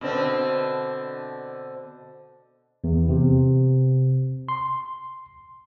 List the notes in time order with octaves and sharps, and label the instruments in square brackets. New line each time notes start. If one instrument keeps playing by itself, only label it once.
[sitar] B2 D3 C4
[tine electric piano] E2
C3
C6